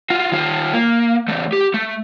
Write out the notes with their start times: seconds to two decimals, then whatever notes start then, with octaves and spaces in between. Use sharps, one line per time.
0.10 F4 F#4
0.32 D#3 F4
0.73 A#3
1.28 E2 A3
1.53 G4
1.74 A3